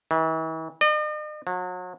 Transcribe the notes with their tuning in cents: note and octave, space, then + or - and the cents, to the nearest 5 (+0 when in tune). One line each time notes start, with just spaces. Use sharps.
E3 -40
D#5 -45
F#3 -35